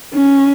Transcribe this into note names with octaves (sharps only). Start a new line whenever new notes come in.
C#4